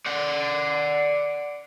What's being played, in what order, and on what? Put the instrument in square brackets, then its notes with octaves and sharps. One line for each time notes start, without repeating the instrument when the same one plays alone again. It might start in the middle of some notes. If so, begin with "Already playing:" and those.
[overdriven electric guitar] D5 F#5